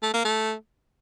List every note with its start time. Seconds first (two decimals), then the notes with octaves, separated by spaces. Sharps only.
0.02 A3
0.14 A#3
0.25 A3